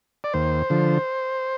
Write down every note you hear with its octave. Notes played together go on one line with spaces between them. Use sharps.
D5
D#2 C5
D3 F3